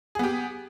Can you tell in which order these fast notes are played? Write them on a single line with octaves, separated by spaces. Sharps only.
G#4 B3 G4